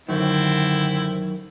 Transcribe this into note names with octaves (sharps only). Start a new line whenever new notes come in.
F#2 D3 D#3 C4 E4